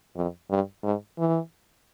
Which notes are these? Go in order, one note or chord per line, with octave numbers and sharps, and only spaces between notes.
F2
G2
G#2
E3